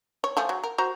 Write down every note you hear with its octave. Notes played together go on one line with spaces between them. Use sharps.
C#5
F3 A3 G#4
F#3
A#4
F#4 C5 A#5